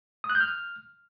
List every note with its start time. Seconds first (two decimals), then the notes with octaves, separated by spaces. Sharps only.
0.24 D#6
0.30 F#6
0.35 G6
0.40 F6